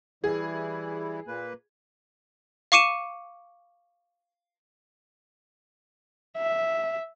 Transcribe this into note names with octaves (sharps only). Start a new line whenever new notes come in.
E3 G3 E4 G#4
A#2 A#3 B4
F5 C#6 D6 C#7 D#7 E7
E5